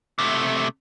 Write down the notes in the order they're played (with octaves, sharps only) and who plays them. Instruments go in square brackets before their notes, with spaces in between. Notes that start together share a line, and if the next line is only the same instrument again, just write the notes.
[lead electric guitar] C3 A3